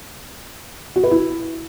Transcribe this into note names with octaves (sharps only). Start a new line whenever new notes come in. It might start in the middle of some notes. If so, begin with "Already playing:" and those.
F#4
B4
E4